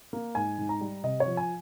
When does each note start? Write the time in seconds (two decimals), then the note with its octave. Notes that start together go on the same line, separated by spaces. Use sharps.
0.13 A#3
0.35 G#2 G#5
0.58 G#2
0.69 A#5
0.81 G3
1.03 C3 D#5
1.20 C#5
1.26 F3
1.37 G#5